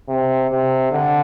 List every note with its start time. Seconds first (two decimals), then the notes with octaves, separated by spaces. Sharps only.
0.08 C3
0.50 C3
0.91 D3